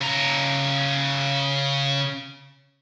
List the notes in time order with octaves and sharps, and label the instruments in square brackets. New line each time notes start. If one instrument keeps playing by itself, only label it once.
[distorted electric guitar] C#3 A#5